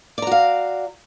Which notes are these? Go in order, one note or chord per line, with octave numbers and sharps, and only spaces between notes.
F#4 D5 F5 A#5